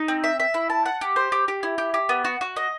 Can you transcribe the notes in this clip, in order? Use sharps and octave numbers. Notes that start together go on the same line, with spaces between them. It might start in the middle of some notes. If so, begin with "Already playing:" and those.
Already playing: D#4
C4
E5
E5
E4
A5
F#5
G4
C5
G4
G4
E4
G4
G4
B3
F#4
F#4
D#5